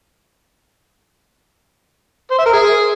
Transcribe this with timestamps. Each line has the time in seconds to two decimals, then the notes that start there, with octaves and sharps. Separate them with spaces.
2.31 C5
2.39 E5
2.46 A#4
2.53 G#4